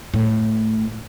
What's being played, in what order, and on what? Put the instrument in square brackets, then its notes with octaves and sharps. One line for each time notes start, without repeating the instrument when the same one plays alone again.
[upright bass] A2